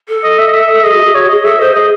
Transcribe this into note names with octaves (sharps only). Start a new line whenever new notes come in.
A4
D#5
E5
D#5
E5
G#4 D#5
F#4
G#4
F#4 C#5
G#4 D#5
A4 E5
C5 D#5
G#4 D#5